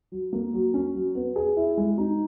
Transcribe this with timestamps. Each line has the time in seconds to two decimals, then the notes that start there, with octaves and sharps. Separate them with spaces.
0.12 F#3
0.33 A#3
0.53 F#3
0.74 C#4
0.95 F#3
1.15 B3
1.36 G#4
1.57 E4
1.77 G#3
1.98 D#4